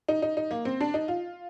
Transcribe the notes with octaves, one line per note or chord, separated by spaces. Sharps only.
D#4
D#4
D#4
A#3
C4
D4
D#4
F4